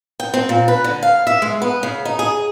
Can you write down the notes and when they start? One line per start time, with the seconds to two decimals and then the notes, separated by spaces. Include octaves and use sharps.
0.20 G5
0.34 C4
0.49 A#2
0.68 B4
0.84 D3
1.03 F5
1.27 E5
1.42 G#3
1.62 B3
1.83 C#3
2.05 D#4
2.19 G#4